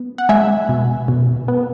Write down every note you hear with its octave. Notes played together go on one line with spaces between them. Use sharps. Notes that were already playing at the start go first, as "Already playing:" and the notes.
Already playing: B3
F#5
G#3 E5 G#5
B2
B2
B3